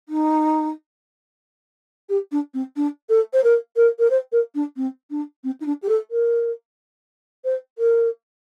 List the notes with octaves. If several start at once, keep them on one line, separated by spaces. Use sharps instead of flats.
D#4
G4
D4
C4
D4
A4
C5
A#4
A#4
A#4
C5
A#4
D4
C4
D4
C4
D#4
D4
G4
A4
A#4
C5
A#4